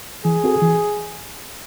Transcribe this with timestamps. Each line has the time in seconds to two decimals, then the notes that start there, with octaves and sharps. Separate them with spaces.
0.25 E3 G#4
0.44 C4 F#4 A4
0.62 E3